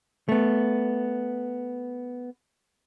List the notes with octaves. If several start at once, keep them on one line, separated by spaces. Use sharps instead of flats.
A3 B3